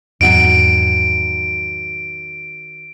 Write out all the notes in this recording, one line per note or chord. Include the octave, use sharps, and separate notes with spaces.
E2 G#2 D#3 F#3 C4 D7